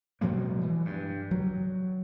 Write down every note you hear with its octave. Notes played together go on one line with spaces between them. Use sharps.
B2 F#3 G#3 A#3
E3
G2
F#3